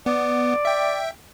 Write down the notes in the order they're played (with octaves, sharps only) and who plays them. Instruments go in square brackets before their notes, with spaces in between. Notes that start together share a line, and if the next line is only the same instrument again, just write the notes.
[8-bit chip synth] B3 [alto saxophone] D5
[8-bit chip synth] E5 G5